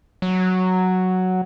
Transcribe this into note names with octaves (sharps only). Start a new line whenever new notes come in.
F#3